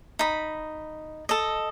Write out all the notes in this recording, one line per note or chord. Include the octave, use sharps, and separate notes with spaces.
D#4 B5
A4 D#5